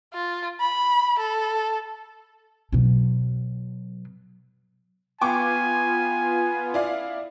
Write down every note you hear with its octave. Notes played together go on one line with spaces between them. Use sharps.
F4
B5
A4
B2 F#3
B3 F4 G5 G#5 C#6 D6
E4 D5 F5